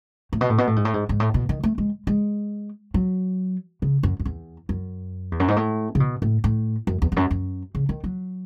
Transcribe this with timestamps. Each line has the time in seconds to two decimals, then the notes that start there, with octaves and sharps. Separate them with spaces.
0.33 A2
0.41 B2
0.50 A2
0.58 B2
0.67 A2
0.76 G#2
0.85 A2
0.94 G#2
1.09 G#2
1.20 A2
1.34 B2
1.49 D#3
1.63 A3
1.78 G#3
2.07 G#3
2.94 F#3
3.82 C#3
4.03 F#2
4.20 F#2
4.25 E2
4.69 F#2
5.32 E2
5.40 F#2
5.48 G#2
5.56 A2
5.95 C#3
6.00 B2
6.22 A2
6.44 A2
6.87 F#2
7.02 E2
7.12 E2
7.17 F#2
7.31 F#2
7.75 C#3
7.89 D#3
8.04 F#3